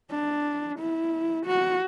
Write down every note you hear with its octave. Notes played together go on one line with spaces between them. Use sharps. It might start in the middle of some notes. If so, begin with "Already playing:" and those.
D4
E4
F#4